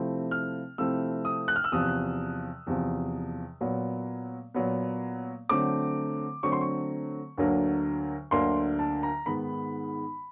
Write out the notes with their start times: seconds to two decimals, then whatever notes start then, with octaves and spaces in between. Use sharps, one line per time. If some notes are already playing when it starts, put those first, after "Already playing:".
Already playing: C3 F3 A3 C4 E4
0.31 F6
0.78 C3 F3 A3 C4 E4 E6
1.25 D#6
1.48 F#6
1.56 F6
1.64 E6
1.72 E2 C3 F3 D#6
2.67 E2 C3 F3
3.61 A#2 F#3 B3
4.54 A#2 F#3 B3
5.49 D3 F#3 A3 C4 D6
6.43 D3 F#3 A3 C4 C#6
6.52 C6
6.61 C#6
7.38 D2 D3 F#3 A#3 D4
8.31 D2 D3 F#3 A#3 D4 C6
8.79 A5
9.03 A#5
9.26 G#2 D#3 G#3 B3 B5